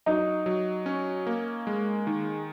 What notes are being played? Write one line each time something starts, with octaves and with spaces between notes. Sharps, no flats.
F#3 D#4
F#3
C#4
A#3
G#3
D#3